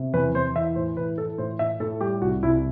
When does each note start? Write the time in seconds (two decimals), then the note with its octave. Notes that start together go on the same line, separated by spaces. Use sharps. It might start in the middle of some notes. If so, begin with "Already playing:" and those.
Already playing: C3
0.14 E2 B4
0.34 E2 C5
0.56 E3 E5
0.76 A2 C5
0.97 E3 B4
1.18 E3 A4
1.38 A2 C5
1.59 A2 E5
1.80 A2 A4
2.01 G3 G4
2.22 C2 F#4
2.43 C2 E4